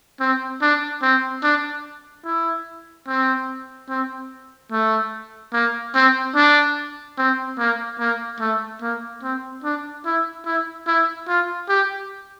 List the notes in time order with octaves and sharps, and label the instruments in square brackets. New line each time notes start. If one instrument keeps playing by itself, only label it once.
[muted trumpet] C4
D4
C4
D4
E4
C4
C4
A3
A#3
C4
D4
C4
A#3
A#3
A3
A#3
C4
D4
E4
E4
E4
F4
G4